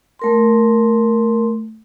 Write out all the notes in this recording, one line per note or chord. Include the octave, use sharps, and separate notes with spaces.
A3 A#4 C6